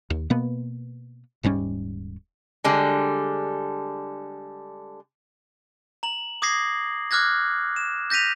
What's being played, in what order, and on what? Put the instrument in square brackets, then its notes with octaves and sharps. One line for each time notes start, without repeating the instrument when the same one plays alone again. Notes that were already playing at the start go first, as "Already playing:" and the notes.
[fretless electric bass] D#2
B2 A#3 B3
D#1 G#2 G3 C#4
[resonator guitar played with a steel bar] D3 G3 G#3
[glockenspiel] A#5 F#7
D6 D#6 G#6 A#6 C7
D6 F6 F#6 G#6 A#6
E7
G6 A#6 B6 D#7 F7